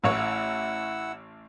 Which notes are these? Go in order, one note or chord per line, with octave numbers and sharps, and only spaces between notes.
A1 E4 C#5 F#5 E6